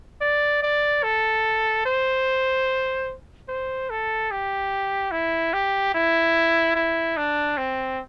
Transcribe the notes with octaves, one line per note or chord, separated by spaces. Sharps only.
D5
D5
A4
C5
C5
A4
G4
E4
G4
E4
E4
D4
C4